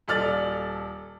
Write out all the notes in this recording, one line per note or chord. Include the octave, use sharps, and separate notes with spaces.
D#1 A4 D5 F6 A6